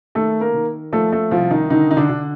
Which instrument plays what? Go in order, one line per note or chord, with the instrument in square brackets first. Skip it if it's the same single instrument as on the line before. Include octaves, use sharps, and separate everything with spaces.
[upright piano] D#3 A3 A4
A#3 A#4
D#3
F3 A3 A4
A3 A4
C2 F3 F4
D#3 D#4
D3 D#3 D#4
D#4
D3 D4
D3